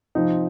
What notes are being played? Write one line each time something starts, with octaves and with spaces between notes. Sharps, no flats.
C3 F3 C4 D#4